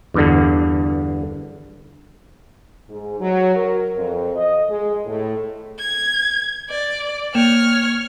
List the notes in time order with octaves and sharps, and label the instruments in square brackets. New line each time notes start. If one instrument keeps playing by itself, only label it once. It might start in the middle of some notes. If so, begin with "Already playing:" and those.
[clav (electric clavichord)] E2 G2 D3
[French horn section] G#2
F#3
A#4
F2
D#5
G#3
A2
[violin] G#6
D5
[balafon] A#3 [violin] C#5 F6